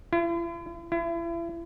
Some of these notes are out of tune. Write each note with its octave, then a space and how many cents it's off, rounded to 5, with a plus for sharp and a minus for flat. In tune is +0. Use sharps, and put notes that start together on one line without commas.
E4 +45
E4 +35